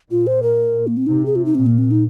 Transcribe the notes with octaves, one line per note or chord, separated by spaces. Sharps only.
A#2 F4
C5
A#4
A#3
C4
C3 D#4
G#4
F4
D#4
A#2 C4
A#3
C4
D#4